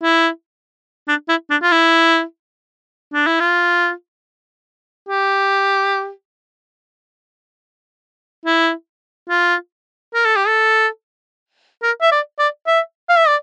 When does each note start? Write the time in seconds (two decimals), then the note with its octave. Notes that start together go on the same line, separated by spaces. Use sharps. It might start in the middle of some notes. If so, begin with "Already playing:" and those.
0.02 E4
1.08 D4
1.29 E4
1.50 D4
1.62 F4
1.71 E4
3.13 D4
3.27 E4
3.40 F4
5.09 G4
8.46 E4
9.29 F4
10.14 A#4
10.25 A4
10.36 G4
10.47 A4
11.82 A#4
12.01 E5
12.11 D5
12.39 D5
12.67 E5
13.09 F5
13.18 E5
13.27 D5